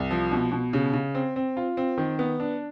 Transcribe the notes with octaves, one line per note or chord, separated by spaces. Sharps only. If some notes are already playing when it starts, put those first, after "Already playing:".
Already playing: C2
F3
B2
B2
C#3
C#3
C4
C4
F4
C4
D#3
B3
D4